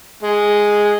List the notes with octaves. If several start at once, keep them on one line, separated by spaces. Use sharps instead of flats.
G#3